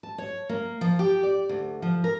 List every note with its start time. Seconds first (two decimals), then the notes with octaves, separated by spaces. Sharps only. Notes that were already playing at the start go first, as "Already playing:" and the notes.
0.03 A5
0.18 C#5
0.49 A#3
0.81 F3
0.99 G4
1.23 D5
1.49 D2
1.82 F3
2.04 A#4